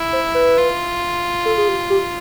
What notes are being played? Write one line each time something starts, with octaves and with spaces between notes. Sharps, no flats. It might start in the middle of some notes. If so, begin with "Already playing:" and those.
Already playing: E4
C5
B4
F4
A4
G#4
G4
G4